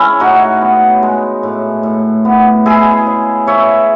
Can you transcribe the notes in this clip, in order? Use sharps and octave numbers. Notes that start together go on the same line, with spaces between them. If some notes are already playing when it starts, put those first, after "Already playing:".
Already playing: G#3 C#4 E4
A2 D#4 F#4
B3
G#3
A2
A2
B3
G#3 E4 G#4
C#3
C#3 C#5 E5